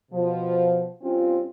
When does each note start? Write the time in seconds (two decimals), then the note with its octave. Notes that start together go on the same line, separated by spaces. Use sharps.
0.12 B2 F3
1.02 G2 C4 C#4 F4